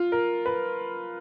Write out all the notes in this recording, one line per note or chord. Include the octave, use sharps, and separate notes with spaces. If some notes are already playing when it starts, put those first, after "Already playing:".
Already playing: F4
A#4
B4